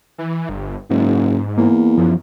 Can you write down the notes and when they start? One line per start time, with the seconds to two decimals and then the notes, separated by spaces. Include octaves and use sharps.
0.18 E3
0.49 G1
0.90 F#1 G#2
1.58 E2 A#3
1.98 F#2 F3